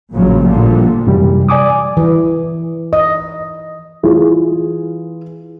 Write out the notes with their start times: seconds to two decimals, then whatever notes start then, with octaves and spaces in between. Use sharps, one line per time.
0.12 A1 G2 A#2 C#3 F3 F#3
0.43 A#2 D3 F3 G3
1.07 F#2 C3 E3 G3
1.49 D5 G#5 D6 D#6
1.97 E3
2.93 D#5
4.03 E3 F4 G#4